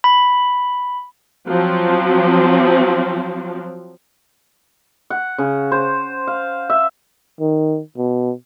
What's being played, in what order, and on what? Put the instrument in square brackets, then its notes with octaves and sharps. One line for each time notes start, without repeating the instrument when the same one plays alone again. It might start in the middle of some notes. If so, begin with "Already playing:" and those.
[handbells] B5
[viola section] F3 F#3 C4
[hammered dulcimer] F#5
C#3
C5
F5
E5
[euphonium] D#3
B2